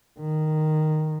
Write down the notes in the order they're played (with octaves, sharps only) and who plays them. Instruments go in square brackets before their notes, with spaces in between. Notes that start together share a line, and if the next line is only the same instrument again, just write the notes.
[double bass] D#3